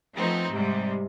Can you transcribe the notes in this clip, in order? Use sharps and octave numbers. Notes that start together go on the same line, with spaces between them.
F3 A3 B3 C4 D#4
G#2 C3 G3